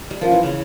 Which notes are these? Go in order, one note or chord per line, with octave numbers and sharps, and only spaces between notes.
G3
F3 C#4 F4 A#4 F5
E3
C#3